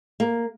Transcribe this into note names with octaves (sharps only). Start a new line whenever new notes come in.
A#3